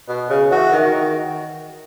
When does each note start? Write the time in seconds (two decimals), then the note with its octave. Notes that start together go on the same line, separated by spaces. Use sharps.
0.09 B2
0.30 C#3
0.51 E3 F#4
0.72 D#3
0.93 D#3